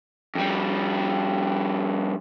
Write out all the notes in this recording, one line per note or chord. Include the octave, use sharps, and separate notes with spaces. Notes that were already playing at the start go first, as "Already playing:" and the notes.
F2 G3